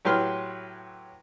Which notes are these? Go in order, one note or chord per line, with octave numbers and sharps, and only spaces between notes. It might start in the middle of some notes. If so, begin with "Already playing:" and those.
A2 F#3 G4 B4 C6 F6